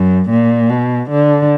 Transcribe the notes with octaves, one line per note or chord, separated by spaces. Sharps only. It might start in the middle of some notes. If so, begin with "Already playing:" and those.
Already playing: F#2
A#2
B2
D3